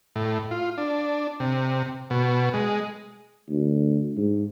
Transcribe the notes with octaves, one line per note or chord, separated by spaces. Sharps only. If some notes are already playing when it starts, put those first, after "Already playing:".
A2
F4
D4
C3
B2
G#3
D2
G#2